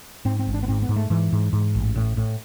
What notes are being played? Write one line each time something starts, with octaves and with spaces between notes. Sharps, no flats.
G#2 C4
C4
G#1
D4
B3
G#2 C4
B3
G#2
A3
G#2 E3
G#2
G#2
A1
A2
A2